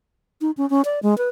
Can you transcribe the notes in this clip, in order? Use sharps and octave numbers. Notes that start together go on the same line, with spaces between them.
D#4
C#4
C#4
D5
G#3
B4